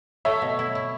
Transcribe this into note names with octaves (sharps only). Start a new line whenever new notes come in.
A3 C#5 E5
B2
E4
E4